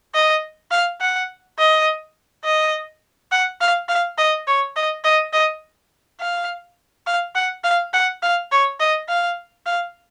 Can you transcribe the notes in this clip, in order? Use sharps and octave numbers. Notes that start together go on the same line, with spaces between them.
D#5
F5
F#5
D#5
D#5
F#5
F5
F5
D#5
C#5
D#5
D#5
D#5
F5
F5
F#5
F5
F#5
F5
C#5
D#5
F5
F5